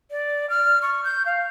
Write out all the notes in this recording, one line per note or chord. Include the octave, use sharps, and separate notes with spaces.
D5
F6
C#6
G6
F5